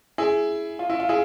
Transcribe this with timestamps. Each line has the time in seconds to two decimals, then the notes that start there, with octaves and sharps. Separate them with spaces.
0.18 E4 G#4
0.79 F4
0.90 E4
1.00 F4
1.09 E4 G#4